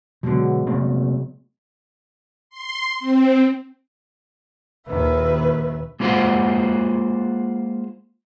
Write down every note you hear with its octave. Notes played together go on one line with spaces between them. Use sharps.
B2 D3 F#3 G#3 B3
C3 A3 A#3
C6
C4
A#1 D#2 D#3 B4 E5
G#3 A#3 F4 C5 F5 F#5